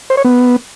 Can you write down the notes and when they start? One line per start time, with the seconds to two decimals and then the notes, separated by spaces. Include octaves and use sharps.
0.10 C5
0.17 C#5
0.25 B3